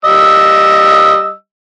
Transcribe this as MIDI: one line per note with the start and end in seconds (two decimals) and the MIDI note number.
0.05 1.33 55
0.05 1.33 75
0.05 1.33 88